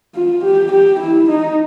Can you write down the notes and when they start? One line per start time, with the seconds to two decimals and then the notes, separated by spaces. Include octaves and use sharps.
0.16 F4
0.44 G4
0.72 G4
1.00 E4
1.29 D#4